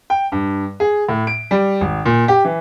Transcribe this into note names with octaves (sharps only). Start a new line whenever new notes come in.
G5
G2
G#4
A2
D7
G3
G#1
A#2
G4
E3